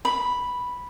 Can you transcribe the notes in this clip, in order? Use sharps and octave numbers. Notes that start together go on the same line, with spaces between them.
B5